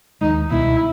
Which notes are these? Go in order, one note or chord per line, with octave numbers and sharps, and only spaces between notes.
D#2 D#3 G#3 D#4
C#2 B2 G3 B3 E4